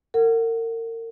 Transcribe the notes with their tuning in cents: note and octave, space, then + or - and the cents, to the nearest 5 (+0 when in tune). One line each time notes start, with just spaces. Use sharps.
A#4 -35 F#5 +5